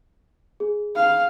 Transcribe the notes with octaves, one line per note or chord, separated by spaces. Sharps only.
G#4
F5